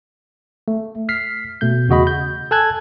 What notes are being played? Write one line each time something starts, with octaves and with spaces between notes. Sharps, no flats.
A3
F6 B6 C7
B2 A3 G6
E2 C#3 F#4 D#5 B5
G6
A4 G#5 A5 E6 F#6 G#6